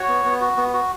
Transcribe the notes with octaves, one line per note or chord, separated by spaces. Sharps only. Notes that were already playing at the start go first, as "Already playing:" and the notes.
Already playing: F#4 C#5
B3
B3
F#4
B3
F#4